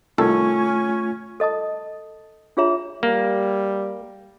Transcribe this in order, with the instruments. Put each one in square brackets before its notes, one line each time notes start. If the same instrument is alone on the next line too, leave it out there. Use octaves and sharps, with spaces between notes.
[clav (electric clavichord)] C2 D#3 A4 [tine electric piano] A3 F4 [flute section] C#4 G#5 C#6
[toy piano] A4 D#5 A5 D#6
D4 F4 G#4 C#5 E5 A#5
[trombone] G3 [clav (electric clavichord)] A#3